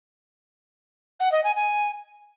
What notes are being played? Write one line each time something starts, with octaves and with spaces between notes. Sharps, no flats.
F#5
D#5
G#5
G#5